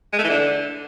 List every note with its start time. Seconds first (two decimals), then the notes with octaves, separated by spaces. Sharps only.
0.13 G#3
0.19 A3
0.24 E3
0.30 D3